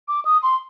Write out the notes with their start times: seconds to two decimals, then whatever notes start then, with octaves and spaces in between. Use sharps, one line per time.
0.08 D6
0.25 D#6
0.43 C6